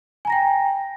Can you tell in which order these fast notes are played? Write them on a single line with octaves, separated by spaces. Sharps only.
G#5 A#5 A#6 G5